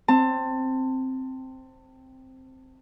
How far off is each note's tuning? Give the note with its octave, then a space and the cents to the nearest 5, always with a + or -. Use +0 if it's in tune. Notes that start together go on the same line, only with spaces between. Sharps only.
C4 +0 A5 +25